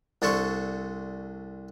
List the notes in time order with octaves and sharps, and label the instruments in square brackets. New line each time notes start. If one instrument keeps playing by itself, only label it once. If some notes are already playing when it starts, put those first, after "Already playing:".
[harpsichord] C2 D4 A4 C5 C#6